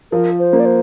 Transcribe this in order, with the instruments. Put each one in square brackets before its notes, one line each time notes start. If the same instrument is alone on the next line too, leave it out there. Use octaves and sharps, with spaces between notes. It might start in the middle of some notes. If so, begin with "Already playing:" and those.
[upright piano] F3 [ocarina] A#4
[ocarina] C5
[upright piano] A#3
[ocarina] D5
C5